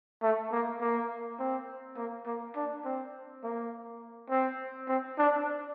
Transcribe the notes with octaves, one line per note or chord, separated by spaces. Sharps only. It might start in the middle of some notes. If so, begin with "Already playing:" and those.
A3
A#3
A#3
C4
A#3
A#3
D4
C4
A#3
C4
C4
D4